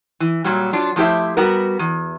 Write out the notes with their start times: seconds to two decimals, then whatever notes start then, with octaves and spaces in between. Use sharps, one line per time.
0.20 E3
0.44 A#2 F#3 G3
0.73 F#3 D4 F4
0.96 F3 A3 E4 G4 C5 E5
1.37 G3 B3 F#4 A#4
1.79 E2